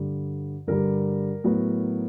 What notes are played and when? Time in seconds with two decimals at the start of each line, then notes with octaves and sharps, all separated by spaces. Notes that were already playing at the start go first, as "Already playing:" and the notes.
Already playing: G2 D3 G3
0.67 G2 D3 G3 A#4
1.44 A2 F#3 B3